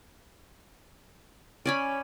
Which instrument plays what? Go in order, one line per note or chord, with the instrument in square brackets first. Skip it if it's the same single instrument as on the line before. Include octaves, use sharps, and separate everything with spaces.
[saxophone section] C#4 [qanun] D5 G#5 B5